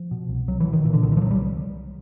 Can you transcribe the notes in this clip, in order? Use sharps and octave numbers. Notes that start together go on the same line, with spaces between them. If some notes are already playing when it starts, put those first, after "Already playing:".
Already playing: F3
B2
C2
C2 F#3
E3
B2
D#3
A#2 E3
D3
C2 D#3
E3
F3
C2 F#3
G3